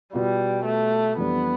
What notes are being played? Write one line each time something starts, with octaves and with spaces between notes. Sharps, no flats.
B2 G3 B3 F4
A3
F2 E3 G3 B3 D4